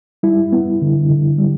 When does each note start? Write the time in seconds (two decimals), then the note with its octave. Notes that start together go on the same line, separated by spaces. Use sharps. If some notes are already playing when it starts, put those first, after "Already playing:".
0.23 G3 E4
0.53 B3
0.82 D3
1.10 D3
1.39 G3